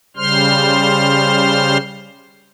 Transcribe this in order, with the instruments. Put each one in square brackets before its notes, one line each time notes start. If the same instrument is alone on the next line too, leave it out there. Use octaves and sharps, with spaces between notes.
[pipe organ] C#3 G3 C5 C6 F6